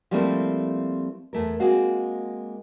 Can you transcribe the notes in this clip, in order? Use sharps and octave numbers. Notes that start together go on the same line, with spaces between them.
F3 G3 A3 A#3 C4 E4
E2 A3 A#4
G#3 A#3 C4 F#4 F5